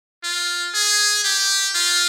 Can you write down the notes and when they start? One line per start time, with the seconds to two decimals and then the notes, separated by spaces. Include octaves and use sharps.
0.23 F4
0.74 G#4
1.24 G4
1.75 F4